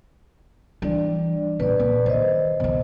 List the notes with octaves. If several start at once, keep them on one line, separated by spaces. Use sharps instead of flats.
E3 G3 D4 D5
A#2 B4 D5
A#2
D#3 C5 D#5
B2 D#3